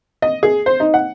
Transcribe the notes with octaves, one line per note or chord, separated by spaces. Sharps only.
D#5
G#4
C5
D#4
F#5